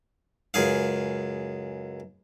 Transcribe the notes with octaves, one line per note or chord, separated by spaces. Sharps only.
C#2 F#2 G#4 F5